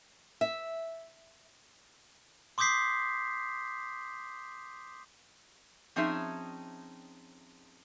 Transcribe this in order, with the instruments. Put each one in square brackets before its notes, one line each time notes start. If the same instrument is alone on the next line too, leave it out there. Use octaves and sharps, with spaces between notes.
[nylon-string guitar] E5
[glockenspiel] C6 D6 D#6 G6 B6 C7
[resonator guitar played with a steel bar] F3 C4 C#4 D#4 G#4 E5